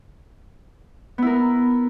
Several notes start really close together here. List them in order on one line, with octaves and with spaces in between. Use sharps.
B3 E4 A#4